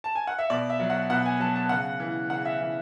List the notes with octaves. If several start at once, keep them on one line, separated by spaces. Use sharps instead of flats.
A5
G#5
F#5
E5
B2 D5
E5
F#3
F#5
B2 F#5
G#5
F#3 A5
A5
C#3 F#5
E3
C#3 F#5
E5
E3